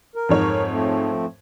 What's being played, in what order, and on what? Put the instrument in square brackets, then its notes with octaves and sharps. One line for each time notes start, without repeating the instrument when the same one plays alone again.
[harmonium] A#4
[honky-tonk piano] F2 G#2 C#5
[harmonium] F3 A3 C4